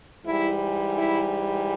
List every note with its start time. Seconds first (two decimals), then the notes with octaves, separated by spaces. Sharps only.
0.24 G#2 E3 G3 E4
0.97 E4